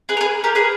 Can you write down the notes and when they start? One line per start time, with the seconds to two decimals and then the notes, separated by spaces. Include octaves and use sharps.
0.09 G#4 B4
0.17 A#4
0.21 G#4 B4
0.44 G4 A#4
0.55 G#4 B4